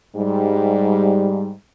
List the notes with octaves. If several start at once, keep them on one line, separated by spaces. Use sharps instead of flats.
G#2 G3